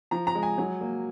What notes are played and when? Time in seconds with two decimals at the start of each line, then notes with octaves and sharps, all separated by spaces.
0.11 F3 A#5
0.27 A#5
0.35 G#3
0.43 G#5
0.58 F#3
0.81 A#3